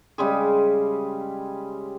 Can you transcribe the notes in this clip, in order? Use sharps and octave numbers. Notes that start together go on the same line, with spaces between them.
C#3 G3 G#3 G#4